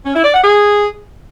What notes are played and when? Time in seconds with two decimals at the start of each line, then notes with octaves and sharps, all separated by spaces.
0.05 C#4
0.14 E4
0.24 D5
0.34 F#5
0.43 G#4